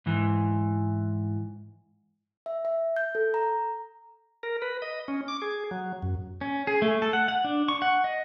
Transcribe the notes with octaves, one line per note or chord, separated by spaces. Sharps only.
G#2 E3
E5
E5
G6
A4
A#5
A#4
B4
D#5
C#4
D6
G#4
F#3
F#2
C#4
G#4
A3
A4
F#5
F#5
D4
C#6
F#5
D#5